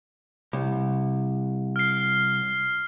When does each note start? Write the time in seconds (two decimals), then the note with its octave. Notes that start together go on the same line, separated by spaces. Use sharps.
0.53 C2
1.76 F6 C7